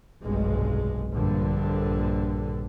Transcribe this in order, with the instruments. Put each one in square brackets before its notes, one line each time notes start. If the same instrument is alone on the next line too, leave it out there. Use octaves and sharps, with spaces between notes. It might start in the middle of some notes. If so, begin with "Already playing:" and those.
[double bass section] F1 B1 G2 G#3
A#1 G2 D3